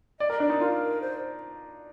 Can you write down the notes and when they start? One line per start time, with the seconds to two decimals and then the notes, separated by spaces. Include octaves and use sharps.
0.20 D5 D#5
0.30 A#4
0.40 D4 D5
0.50 D#4
0.60 F4 A#4
1.02 C5